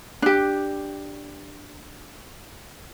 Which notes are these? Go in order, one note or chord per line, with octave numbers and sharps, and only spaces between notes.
D4 G4